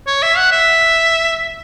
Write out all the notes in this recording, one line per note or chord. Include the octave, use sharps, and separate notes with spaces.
C#5
E5
F#5
E5